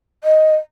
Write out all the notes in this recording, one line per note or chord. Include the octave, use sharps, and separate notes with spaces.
D#5